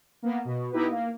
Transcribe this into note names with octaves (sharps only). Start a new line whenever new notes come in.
A#3 B3
B2
B3 D#4 E4 G4 B4
A#3